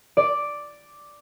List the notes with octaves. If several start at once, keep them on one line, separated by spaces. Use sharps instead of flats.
D5